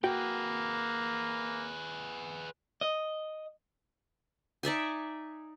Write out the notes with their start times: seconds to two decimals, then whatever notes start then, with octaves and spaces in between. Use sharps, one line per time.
0.04 A#3 F#4 G#4 B4 G5
2.81 D#5
4.63 D#4 D5 E5 G#5